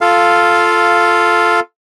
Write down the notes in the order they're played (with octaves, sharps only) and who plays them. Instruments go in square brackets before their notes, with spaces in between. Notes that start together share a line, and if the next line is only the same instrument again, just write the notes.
[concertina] F4 A4 F5